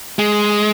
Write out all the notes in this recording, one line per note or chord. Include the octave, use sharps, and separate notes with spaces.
G#3